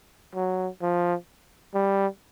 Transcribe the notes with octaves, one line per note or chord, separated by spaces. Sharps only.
F#3
F3
G3